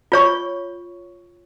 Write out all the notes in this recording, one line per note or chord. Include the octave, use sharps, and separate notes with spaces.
F4 C#5 C#6